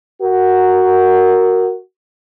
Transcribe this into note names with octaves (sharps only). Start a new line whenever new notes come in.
F#4 A#4